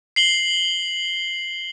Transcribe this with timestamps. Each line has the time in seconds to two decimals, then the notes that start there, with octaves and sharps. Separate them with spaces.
0.16 C7 F#7 G7